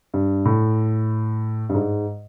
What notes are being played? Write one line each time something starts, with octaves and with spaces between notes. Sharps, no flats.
G2
A2
G2
G#2